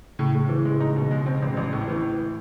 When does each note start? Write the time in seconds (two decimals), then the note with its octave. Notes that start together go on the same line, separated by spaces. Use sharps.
0.19 A2 C#3
0.34 A2
0.49 E3
0.65 G#3
0.80 D#4
0.96 B2
1.11 G#3
1.26 C4
1.42 A1
1.57 A1
1.72 A2
1.88 E3